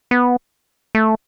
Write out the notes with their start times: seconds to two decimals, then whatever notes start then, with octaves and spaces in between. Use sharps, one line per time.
0.11 B3
0.95 A3